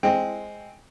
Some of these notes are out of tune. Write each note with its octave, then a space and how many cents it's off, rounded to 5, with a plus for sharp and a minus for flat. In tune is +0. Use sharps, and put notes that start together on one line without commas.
G#3 +0 C4 +0